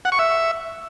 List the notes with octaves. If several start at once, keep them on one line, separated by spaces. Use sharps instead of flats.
F#5
C#6
E5